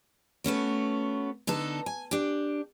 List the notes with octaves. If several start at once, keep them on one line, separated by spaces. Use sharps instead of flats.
A3 B3 C#4 F#4
D3 B3 D#4 A4
G#5
D4 G4